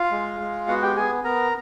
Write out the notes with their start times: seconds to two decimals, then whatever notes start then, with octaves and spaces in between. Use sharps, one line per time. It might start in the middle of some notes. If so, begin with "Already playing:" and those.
Already playing: F4 F5
0.12 G#3
0.40 G#3
0.68 B3 F#4 F#5
0.82 G4 G5
0.96 B3 G#4 G#5
1.24 B3 A#4 A#5